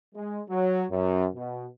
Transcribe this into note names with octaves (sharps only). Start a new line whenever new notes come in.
G#3
F#3
F#2
B2